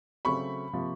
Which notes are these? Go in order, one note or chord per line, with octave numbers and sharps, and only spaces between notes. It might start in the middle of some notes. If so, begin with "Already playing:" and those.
C#3 F#3 A3 C4 B5 C#6
C3 F3 A#3